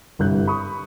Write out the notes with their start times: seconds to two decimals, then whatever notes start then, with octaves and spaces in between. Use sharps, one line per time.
0.19 G1 C2 G2 E4 F#6 G6
0.47 B5 C#6 D#6